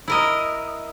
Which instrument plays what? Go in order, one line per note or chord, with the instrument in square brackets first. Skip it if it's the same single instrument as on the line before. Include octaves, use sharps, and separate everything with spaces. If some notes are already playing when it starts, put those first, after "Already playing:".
[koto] E4 A#4 D#5